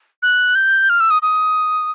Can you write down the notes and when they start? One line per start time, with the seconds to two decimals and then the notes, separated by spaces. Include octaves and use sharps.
0.22 F#6
0.55 G6
0.89 F6
1.00 E6
1.10 D#6
1.22 D#6